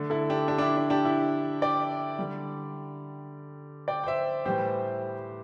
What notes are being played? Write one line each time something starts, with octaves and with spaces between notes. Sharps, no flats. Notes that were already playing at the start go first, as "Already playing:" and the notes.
Already playing: D3 A3
E4 A4
D4 G4
D4 G4
D4
E4
D4
D4 G4
E4
D5 G5
D3 G3
D5 G5
G5
C5 E5
A2 E3 G3 G4 C5